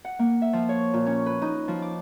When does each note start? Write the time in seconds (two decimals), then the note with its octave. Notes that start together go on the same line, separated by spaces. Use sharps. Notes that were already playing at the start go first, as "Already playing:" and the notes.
0.05 F#5
0.19 A#3
0.42 E5
0.53 F3
0.69 C#5
0.94 A#2
1.06 C#4
1.26 B4
1.42 D#4
1.68 F3
1.82 D6